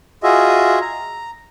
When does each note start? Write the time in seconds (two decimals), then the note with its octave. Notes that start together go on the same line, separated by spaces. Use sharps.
0.23 F4 F#4 G#4 D#5 E5
0.81 A#5